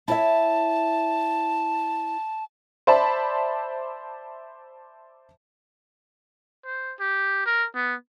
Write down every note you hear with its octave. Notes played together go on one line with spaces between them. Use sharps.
E4 C#5 E5 A5
C5 D5 E5 A5 B5
C5
G4
A#4
B3